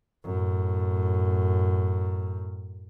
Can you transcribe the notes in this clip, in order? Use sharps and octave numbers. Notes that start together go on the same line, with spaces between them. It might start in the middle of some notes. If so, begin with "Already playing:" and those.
F#2 A2